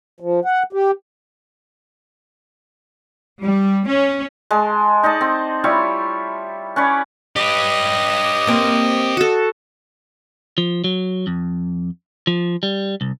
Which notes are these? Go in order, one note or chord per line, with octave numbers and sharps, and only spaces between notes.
F3
F#5
G4
G3
C#4
G#3 A5 C6
D#4 D5 D#5 A5
C4
G3 E4 F4 C#5
C#4 B4 C#5 D5
G4 B4 D#5
A#3 C4
F#4 A4
F3
F#3
F2
F3
G3
C2